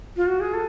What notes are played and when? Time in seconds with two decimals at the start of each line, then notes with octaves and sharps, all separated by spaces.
0.16 F4
0.26 F#4
0.40 G#4
0.53 A4